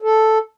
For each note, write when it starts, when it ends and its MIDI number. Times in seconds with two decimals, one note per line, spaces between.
0.02 0.38 69